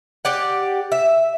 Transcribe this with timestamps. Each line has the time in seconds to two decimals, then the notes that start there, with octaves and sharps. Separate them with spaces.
0.25 G4 D5 F#5
0.92 E5